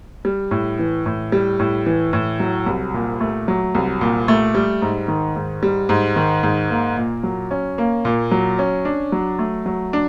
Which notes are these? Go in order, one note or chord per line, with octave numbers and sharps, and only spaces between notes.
G3
A2
E3
A2
G3
A2
E3
A2
F#3
C2
A#2
A3
F#3
C2
A#2
A3
G3
G#2
D#3
G#2
G3
G#2
D#3
G#2
A#3
A#2
F#3
C#4
A#3
A#2
F#3
C#4
D4
F#3
A3
F#3
D4